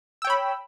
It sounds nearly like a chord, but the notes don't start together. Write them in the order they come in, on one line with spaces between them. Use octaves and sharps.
E6 G5 C#5 B5